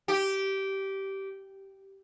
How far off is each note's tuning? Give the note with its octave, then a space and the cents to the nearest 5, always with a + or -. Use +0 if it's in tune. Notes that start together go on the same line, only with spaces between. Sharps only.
G4 -15